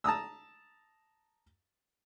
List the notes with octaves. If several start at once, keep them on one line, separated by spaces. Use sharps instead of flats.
A5 A#5 D#6 E6